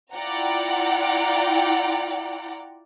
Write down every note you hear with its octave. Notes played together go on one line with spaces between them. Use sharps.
E4 F4 D5 F#5 G5 A#5